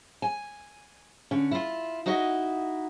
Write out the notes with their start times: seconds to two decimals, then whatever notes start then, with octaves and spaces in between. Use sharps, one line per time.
0.22 G#5
1.31 D3 C#4
1.51 E4 F4
2.06 D#4 E4 F#4 D#5